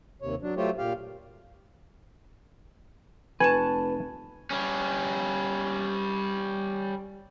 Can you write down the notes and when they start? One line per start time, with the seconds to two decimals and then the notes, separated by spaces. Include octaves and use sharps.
0.22 D#2 C3 C#5
0.42 F#3 D4
0.57 F#3 A3 F4 G4 C5 C#5
0.78 A#2 G4 F5
3.40 F1 B4 G#5 A5 C#6 F#6
4.51 G3 C#4